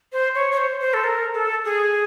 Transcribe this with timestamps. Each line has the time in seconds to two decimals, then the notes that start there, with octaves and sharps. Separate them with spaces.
0.13 C5
0.35 C#5
0.52 C#5
0.57 C5
0.80 C5
0.94 A4
1.04 A#4
1.34 A4
1.65 G#4